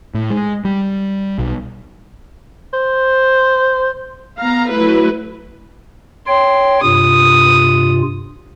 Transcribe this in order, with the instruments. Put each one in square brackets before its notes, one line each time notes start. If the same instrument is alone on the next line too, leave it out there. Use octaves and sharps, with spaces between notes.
[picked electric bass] A2
G#3
G3
B1
[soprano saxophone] C5
[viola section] B3 F5 A#5
F#3 A3 E4 B4
[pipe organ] C#5 G5 [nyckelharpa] C6
[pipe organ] G2 C3 F4 [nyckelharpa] D#6